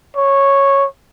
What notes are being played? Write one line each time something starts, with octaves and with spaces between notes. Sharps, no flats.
C#5